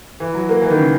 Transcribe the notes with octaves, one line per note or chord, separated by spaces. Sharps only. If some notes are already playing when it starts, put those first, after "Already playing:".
E3
F#3
A#3
E3
D#3
C#3